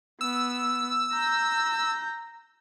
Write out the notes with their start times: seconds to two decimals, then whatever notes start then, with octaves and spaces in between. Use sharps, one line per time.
0.21 B3 E6
1.13 A#5 G6